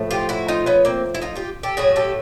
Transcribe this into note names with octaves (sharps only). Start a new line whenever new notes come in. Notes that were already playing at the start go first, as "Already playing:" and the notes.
Already playing: A2 F3 A3
F4 G4
E4 F#4
D#4 F4
B3 C#4
A#3 C4
E4
D#4 F4
F4 G4
G4 A4
A2 F#3 A3 F#4 G#4
G4 A4